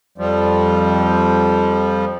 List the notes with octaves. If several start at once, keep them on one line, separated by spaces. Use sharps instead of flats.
F2 F3 G3